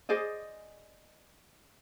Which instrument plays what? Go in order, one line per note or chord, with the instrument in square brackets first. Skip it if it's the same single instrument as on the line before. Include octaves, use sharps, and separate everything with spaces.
[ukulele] G#4 C5 D5 D#5